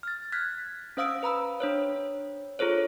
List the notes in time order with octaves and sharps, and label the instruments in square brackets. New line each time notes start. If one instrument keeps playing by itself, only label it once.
[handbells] F6 A6
F6 F#6 G#6 B6
C#4 C5 F5 D#6 E6 D7
B4 A#5 B5 E6
D4 C5 C#5
F4 G#4 A4 C5 C#5